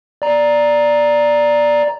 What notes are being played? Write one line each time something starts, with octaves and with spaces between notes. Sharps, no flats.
D5 A#5